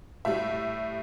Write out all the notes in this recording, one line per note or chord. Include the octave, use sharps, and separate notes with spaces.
A2 G3 E5